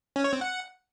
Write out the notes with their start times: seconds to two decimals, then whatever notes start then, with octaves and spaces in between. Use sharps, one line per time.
0.16 C#4
0.24 C#5
0.33 C4
0.41 F#5